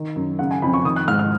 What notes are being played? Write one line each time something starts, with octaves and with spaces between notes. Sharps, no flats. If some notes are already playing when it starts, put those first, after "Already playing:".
Already playing: D#3
F#2
C#3 F#5
G#5
F2 B5
C#6
D#3 D#6
F#6
G#2 F6
F6